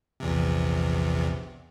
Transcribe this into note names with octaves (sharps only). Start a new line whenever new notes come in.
A#1 E2 C3